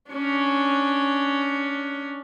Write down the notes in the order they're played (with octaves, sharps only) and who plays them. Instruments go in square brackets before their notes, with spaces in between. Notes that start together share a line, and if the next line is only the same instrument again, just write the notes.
[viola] C#4 D4